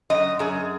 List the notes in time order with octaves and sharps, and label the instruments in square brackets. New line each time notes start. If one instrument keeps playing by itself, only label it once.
[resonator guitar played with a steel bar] F#2 D#5
F#2 G#4